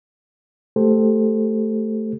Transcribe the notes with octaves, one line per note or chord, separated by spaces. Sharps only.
A3 G4 A4 C5